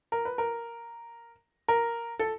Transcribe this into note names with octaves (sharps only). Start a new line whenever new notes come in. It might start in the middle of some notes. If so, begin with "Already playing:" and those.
A#4
B4
A#4
A#4
A4